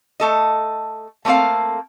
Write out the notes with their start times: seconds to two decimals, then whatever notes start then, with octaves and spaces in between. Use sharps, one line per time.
0.20 A3 A4 D#5
1.25 A3 A#3 C4 A4 F5